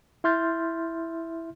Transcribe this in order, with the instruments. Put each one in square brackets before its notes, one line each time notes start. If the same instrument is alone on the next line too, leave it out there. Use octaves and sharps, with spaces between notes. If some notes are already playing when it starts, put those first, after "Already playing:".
[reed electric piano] E4 E5 C6 F6 G6 A6